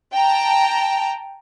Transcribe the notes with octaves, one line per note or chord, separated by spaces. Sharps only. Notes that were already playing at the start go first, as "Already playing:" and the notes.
G5 A5 A#5